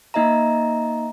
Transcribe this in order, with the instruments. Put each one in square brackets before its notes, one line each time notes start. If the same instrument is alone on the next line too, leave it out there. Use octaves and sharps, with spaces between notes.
[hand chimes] A#3 D#4 D#5 E5 A#5